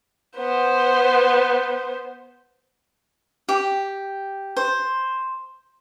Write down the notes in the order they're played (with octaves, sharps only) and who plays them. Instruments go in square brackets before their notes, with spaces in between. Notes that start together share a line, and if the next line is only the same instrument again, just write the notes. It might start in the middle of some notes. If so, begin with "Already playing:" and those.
[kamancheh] B3 C5
[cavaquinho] G4
C5